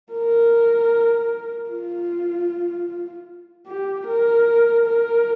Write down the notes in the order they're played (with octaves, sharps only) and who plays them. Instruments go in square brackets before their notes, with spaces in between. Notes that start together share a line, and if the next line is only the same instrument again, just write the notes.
[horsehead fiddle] A#4
F4
G4
A#4
A#4